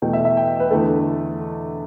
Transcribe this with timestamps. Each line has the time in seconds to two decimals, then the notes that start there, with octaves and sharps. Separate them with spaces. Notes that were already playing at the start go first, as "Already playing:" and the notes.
0.02 E2 B2 A3 G5
0.13 E5
0.25 E5
0.37 G5
0.60 B4
0.71 E2 D3 A3 A4